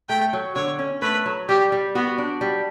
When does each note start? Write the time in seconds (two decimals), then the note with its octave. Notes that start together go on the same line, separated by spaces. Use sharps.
0.09 A3 G5
0.33 F#3
0.55 D3 C#5
0.79 C#4
1.02 A3 B4
1.26 F#3
1.48 G3 G4
1.72 G3
1.95 B3 F#4
2.18 D4
2.41 G3